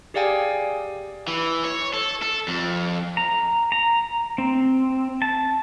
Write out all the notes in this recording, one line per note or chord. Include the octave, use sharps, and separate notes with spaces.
G4 G#4 D5 F5 G5 G#5
E3
C#5
A4
A4
F2
A#5
A#5
C4
A5